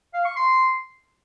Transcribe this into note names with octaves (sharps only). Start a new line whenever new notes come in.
F5
C#6
C6